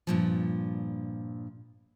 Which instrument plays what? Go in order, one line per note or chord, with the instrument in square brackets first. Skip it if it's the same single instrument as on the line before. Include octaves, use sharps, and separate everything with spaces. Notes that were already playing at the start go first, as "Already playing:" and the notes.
[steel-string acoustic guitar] G2 A#2 F3